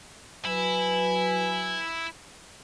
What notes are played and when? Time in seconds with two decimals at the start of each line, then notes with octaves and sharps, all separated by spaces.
0.45 F#3 E4 B4 G#5